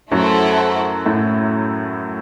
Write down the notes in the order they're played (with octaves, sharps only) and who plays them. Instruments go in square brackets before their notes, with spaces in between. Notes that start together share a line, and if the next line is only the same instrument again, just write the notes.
[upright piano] F#2 F#3 [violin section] A3 E4 A4 C5 F#5
[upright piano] A2 A3